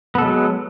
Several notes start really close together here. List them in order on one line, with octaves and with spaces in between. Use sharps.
B3 A4 G#3 F#3